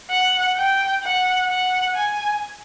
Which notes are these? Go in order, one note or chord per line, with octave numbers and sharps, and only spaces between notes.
F#5
G5
F#5
F#5
G#5